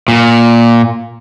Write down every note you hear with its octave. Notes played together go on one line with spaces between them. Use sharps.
A#2